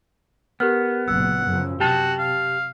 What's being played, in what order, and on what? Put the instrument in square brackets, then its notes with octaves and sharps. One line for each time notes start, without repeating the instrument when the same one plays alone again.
[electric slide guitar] B3 [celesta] G4 A#4 F6
[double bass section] F#1 A#2 [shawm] F#5 [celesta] E6
[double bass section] F#2 C#3 F3
[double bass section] C3 [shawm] F#4 [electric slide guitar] G4 A5
[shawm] F5